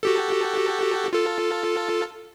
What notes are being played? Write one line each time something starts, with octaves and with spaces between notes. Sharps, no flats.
F#4 G4 A4
F4 A4